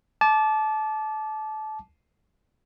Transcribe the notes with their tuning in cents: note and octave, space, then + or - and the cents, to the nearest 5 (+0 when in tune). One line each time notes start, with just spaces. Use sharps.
A5 -25 D6 +0